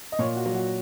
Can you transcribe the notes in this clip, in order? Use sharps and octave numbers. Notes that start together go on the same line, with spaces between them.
D#5
A#2 C#5
F#4
F#3
F#4